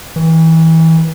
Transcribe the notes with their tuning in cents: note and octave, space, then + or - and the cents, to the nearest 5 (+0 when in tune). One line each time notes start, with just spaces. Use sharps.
E3 -30